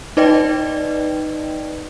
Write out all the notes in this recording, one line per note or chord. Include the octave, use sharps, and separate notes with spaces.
D#4 B4 D5 D#5 G5